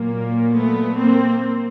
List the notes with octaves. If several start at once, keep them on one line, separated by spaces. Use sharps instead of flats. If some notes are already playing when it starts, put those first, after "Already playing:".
Already playing: A#2 F#3 A#3
A3 B3
A#3 C4